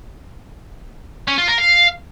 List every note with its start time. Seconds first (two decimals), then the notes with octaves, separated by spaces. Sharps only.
1.28 C#4
1.38 F4
1.48 A#4
1.59 F5